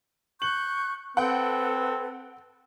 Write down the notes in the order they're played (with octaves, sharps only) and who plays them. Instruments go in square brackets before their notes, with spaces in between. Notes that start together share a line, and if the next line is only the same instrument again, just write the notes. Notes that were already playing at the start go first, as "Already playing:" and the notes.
[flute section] C#6 F#6 G6 [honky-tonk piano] F#7
[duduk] C4 [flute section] A4 B4 [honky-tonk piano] F#5 G5